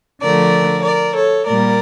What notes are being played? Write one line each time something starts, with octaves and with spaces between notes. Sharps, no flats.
D3 F3 A3 A#4 D5
A#4 D5
A4 C#5
A#2 G3 A#3 A#4 D5